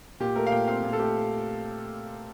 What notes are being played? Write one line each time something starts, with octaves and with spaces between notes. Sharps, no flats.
A#2 G4
A3 A#4
F5
A#2 G5
C4 F5
A#2
A4
A3 G4